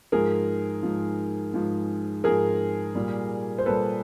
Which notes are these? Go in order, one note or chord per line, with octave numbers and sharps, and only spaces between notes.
G#2 F3 G#4 A#4
G#2 F3
G#2 F3
G#2 F3 G#4 A#4
A#2 G3
C5
A#2 G3 A4 B4